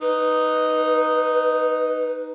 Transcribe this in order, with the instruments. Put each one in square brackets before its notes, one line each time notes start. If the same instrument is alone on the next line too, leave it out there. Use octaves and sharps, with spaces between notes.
[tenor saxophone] D#4 [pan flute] B4